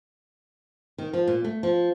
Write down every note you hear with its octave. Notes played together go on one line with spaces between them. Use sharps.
D#3
F3
A#2
A3
F3